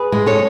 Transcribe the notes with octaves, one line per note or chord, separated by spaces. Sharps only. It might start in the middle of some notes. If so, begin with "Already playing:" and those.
Already playing: G#4 B4
G#3
A4 C#5